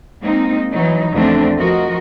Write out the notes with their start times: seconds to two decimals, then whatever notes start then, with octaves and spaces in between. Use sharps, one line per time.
0.22 G#3 A#3 C4 D#4
0.72 E3 F#3 D#4
1.12 E2 D3 F3 A3 C4 D4
1.59 F3 F#4 A#4 D#5